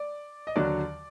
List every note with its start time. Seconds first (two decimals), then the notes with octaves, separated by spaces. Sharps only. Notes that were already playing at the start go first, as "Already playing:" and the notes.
Already playing: D5
0.47 D#5
0.56 D#2 D3 F#3 D5